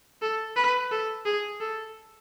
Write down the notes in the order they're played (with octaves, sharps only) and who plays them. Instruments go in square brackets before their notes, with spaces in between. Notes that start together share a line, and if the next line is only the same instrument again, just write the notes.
[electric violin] A4
B4
A4
G#4
A4